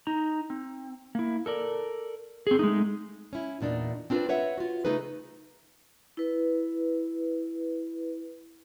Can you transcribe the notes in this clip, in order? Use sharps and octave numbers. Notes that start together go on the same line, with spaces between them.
D#4 A#5
C4
A#3 E4
A4 A#4 D5
C4 G#4
G#3 A3 D#4
C#4 E4
E2 A#2 D4 D#4
C4 D4 F4 A#4 B4
B4 C#5 E5 F#5
F4 F#4
C#3 A3 D#4 G#4 B4
E4 B4